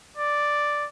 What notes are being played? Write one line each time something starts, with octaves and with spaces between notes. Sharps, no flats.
D5